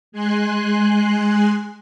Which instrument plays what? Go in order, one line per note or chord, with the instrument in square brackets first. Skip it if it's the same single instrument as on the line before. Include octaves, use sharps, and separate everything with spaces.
[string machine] G#3 G#5 C6 F#6